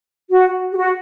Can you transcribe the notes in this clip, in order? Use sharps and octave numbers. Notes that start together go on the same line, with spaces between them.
F#4
G4
F#4